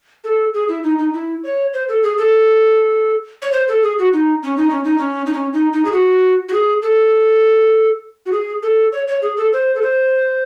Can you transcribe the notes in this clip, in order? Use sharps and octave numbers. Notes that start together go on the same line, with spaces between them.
A4
G#4
E4
D#4
D#4
E4
C#5
C5
A4
G#4
A4
C#5
C5
A4
G#4
F#4
D#4
C#4
D#4
C#4
D#4
C#4
D#4
C#4
D#4
D#4
G#4
F#4
F#4
G#4
A4
F#4
G#4
A4
C#5
C#5
G#4
A4
C5
A4
C5